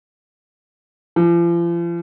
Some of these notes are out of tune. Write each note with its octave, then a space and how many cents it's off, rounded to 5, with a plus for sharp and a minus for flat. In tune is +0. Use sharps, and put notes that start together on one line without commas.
F3 -40